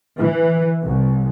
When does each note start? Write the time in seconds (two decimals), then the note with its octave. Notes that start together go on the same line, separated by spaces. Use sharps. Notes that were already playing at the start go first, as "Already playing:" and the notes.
0.17 E3
0.85 C2